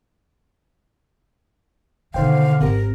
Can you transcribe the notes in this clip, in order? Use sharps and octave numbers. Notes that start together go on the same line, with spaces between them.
B2 D3 D#3 C5 F5 G5
G#1 C4 G4 A#4